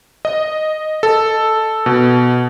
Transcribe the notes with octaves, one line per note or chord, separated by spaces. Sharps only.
D#5
A4
B2